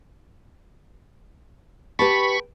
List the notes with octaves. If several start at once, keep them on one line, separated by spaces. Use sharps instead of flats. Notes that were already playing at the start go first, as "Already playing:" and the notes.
G4 B4 A5 B5 C#6